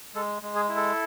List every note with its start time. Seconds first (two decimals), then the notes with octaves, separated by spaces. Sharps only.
0.15 G#3 A4
0.42 G#3
0.55 G#4
0.69 E4
0.76 A4